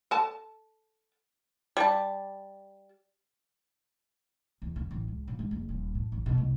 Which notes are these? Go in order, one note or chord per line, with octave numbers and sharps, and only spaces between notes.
A4 A5
G3 A5
E2
D3
A1
C#2
A#2
G#3
F#1
D#1
A2
A1
B2
C2